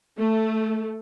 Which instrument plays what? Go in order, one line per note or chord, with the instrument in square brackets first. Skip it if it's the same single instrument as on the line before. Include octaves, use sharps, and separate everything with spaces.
[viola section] A3